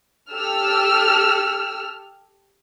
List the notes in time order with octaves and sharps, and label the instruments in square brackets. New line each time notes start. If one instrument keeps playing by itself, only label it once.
[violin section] G4 A4 E6 F6